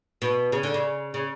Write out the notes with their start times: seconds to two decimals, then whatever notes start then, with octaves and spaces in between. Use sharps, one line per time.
0.22 B2
0.52 C#3
0.63 D3
0.74 C#3
1.14 C#3